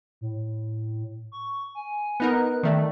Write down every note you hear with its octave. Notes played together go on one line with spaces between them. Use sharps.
A2
C#6
G#5
B3 D#4 A#4 F#6
D#3 A3 D5